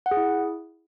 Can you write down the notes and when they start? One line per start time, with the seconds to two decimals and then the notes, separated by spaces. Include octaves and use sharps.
0.06 F#5
0.11 G#4
0.17 E4